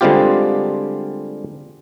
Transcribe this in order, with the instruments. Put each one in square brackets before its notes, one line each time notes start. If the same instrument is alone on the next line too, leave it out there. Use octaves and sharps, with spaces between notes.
[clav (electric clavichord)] D3 G3 G#3 C4 F4 G4